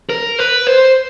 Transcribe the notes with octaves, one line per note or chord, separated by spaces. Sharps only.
A#4
B4
C5